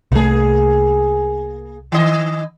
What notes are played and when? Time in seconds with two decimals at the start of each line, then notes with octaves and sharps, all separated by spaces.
0.12 C2 A3 A#3 G#4
1.92 D#3 D#5